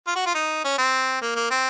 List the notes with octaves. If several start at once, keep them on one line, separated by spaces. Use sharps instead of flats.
F4
F#4
F4
D#4
C#4
C4
A#3
A#3
C4